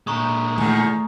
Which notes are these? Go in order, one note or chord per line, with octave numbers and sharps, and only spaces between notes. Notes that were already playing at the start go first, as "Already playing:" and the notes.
A#2 G#3 A#5 C#6 D#6
E2 D#3 A3